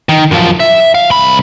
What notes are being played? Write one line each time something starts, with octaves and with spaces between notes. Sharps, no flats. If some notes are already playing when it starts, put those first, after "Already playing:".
D#3
F#2 F3
E5
F5
C2 B5